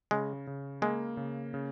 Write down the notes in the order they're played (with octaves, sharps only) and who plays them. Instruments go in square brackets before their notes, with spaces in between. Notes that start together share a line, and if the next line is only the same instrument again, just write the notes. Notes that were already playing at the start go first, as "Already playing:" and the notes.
[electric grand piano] C#3 [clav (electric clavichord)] G#3
[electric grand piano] C#3
[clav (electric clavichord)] G#3 [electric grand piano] A#3
[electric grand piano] C#3
C#3